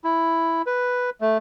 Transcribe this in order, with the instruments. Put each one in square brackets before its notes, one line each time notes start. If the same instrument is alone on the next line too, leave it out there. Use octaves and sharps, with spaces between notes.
[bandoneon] E4
B4
A3